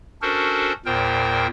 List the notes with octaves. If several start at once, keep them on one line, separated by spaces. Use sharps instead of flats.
C#4 D4 F#4 A4 A#4 C5
E2 A#2 A#4 C5 G5